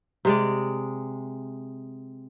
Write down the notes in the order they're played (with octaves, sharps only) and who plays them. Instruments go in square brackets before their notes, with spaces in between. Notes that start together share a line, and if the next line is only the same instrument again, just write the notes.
[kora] C3 G#3 D5